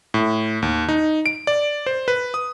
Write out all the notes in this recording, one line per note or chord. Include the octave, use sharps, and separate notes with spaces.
A2
D#2
D#4
D7
D5
C5
B4
D#6